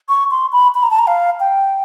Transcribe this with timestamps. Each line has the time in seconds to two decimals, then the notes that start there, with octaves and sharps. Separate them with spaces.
0.09 C#6
0.31 C6
0.52 B5
0.75 B5
0.83 A#5
0.91 A5
0.99 A#5
1.07 F5
1.40 G5